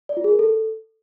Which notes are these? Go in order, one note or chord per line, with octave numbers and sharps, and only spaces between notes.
D5
F4
G#4
A#4
A4